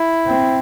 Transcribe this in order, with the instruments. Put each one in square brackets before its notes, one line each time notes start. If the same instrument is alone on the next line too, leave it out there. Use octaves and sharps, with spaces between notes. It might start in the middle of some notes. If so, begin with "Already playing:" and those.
Already playing: [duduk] E4
[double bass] C4